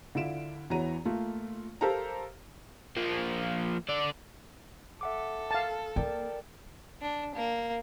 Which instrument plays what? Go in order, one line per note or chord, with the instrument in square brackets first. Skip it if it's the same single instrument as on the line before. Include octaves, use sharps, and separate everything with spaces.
[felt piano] D3 E4 F4 D7 E7
E2 E3 F#4 C#5 A#5 D#7
A3 A#3 F4
G4 A4 A#4 C5 F5 A#5
[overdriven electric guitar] F3 A#3
D3 D5
[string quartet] A4 [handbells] E5 F#5 D6
[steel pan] F5 A5
[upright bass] A#3 [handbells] A#4 D5 G5
[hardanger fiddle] D4
A#3